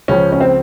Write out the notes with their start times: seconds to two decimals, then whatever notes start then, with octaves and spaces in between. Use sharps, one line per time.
0.08 C#2 C#3 F3 C#4
0.32 C#4
0.41 C4